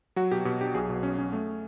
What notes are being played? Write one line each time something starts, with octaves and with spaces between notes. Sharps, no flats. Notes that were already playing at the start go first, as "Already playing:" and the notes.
F#3 F#4
B2 G4
B2 G4
D4 G4
B1 G#4
B2
C#4
C#4
A3